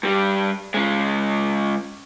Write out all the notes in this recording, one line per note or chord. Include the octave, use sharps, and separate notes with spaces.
G2 G3
C#3 G#3